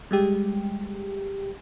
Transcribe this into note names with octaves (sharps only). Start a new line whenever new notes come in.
G3 G#3 G4